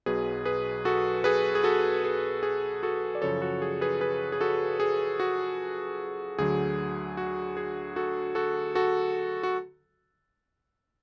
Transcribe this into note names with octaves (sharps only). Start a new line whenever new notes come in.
B1 B2 F#3 G#4 B4
G#4 B4
F#4 A4
G#4 B4
G#4
F#4 A4
G#4
G#4
F#4 A4
D5
F#2 C#3 F3 A4 C#5
F#4 A4
G#4
G#4 B4
G#4 B4
G#4
F#4 A4
G#4
F#4
D2 D3 F#3 G#4
F#4
G#4
F#4 A4
F#4 A4
F#4 A4
F#4